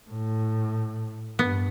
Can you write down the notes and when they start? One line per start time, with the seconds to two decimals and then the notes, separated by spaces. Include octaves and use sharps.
0.10 A2
1.39 G2 B3